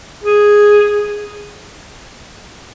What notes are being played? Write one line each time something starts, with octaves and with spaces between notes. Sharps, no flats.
G#4